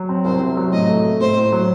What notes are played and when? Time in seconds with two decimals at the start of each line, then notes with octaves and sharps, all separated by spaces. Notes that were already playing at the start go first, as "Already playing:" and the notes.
Already playing: F#3
0.09 C4
0.25 C2 C5
0.40 C3
0.57 F#3
0.72 A2 D#5
0.89 A3
1.05 A3
1.20 A2 C5
1.37 A2
1.52 F#3